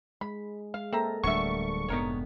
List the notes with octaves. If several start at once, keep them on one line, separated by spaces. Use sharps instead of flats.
G#3 B5
G#3 F5
A#3 C4 A4 A#4 E5 A#5
D1 F#3 G3 A3 D4 E5 C#6
F1 G#2 B3 D#4 A#4 C#5